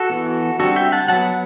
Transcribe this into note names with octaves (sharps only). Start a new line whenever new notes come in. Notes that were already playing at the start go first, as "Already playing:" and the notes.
Already playing: F#4 A4
E3 B3
D3 G3 C4 F#4 A4
E5 G5
F#5 A5
F#3 B3 F#5 A5